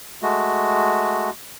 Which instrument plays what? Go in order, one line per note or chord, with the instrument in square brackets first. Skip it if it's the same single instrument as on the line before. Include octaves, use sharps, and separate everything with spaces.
[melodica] G#3 A3 F#4